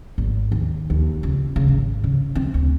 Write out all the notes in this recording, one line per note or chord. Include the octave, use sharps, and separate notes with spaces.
G#1
D#2
D#2
C#2
C#3
G#1
C#3
C4
D2